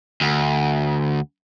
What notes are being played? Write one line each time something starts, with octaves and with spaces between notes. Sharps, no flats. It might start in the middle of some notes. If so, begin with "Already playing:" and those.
D2